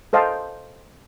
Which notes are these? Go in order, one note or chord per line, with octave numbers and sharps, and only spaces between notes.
A4 C5 D#5 F5 G5 A5